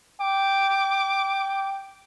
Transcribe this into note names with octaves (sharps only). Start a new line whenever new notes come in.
G5 D6